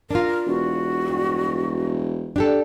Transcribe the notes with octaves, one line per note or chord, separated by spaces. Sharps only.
D4 F4 A#4
E1 F#4
G2
D4 G4 A4 D5 F#5